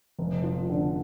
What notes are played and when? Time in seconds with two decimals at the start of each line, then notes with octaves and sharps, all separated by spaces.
0.19 F1
0.44 F3
0.70 D3